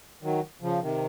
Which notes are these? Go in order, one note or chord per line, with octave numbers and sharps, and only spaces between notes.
D#3 F#3
C#3 F3
C3 D#3